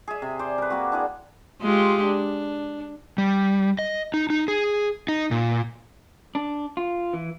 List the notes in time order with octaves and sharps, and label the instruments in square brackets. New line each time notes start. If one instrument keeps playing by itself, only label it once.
[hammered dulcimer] G#4 E5
C3
C5 D5
A#4 B4
A#3 C4 F#4
D4 E4 G#4
[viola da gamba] G#3 F4 G4
D4
[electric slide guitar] G3
D#5
D#4
D#4
G#4
D#4
A#2
D4
F4
E3